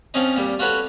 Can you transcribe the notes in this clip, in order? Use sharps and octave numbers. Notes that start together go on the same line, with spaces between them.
F3 C4 C#4 D#4
A#2 G3
F4 F#4 A4 B4 C#5